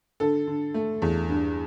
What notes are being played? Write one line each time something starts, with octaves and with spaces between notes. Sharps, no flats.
D3 A4
D3
A3
E2
G2